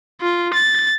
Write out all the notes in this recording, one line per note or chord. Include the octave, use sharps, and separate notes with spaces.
F4
A6